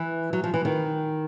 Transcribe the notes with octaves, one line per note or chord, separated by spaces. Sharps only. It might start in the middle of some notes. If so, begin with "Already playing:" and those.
Already playing: E3
F#3
F3
E3
D#3